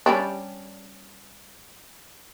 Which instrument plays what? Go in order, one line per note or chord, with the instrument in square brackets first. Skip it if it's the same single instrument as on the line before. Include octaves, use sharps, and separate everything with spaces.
[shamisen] G3 C#4 D4